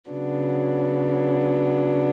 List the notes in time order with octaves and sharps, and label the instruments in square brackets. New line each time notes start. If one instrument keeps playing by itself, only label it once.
[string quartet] C#3 F#3 B3 D4